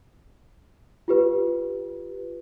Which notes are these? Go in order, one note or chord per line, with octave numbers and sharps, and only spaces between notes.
F4 G4 B4